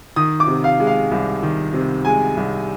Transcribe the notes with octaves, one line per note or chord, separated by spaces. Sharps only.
D#3 D#6
D6
C3
F5
G#3
F5
C2
D#3
C3
G#3 G#5
C2